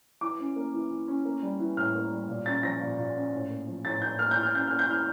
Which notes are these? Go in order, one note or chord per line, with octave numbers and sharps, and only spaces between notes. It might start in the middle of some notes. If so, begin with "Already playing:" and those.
E3 D6
C#4
A#3
E3
E3
C#4
A#3
G3
E3
A2 F6
A#3
G3
A#2
C#4 A6
F3 A#6
A#2
A#2
C#4
A2
A#3
F3
A2 A6
A2 G6
A#3 F6
G6
E3
F6
C#4 G6
A#3 F6
G6
E3 F6